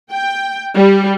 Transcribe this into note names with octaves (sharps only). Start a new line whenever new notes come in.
G5
G3